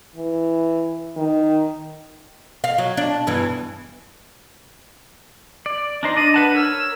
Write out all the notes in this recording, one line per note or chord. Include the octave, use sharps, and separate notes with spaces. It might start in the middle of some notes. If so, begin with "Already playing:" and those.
E3
D#3
F5
F#3
D4
E2 G2 E3
D5
D4 D#4 C5
D4 D5 D#5 D#7
B4 F#5 A5 D#7
A#4 C#5 E6 F6